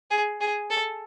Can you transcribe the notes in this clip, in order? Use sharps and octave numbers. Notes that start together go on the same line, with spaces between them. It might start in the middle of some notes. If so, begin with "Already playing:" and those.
G#4
G#4
A4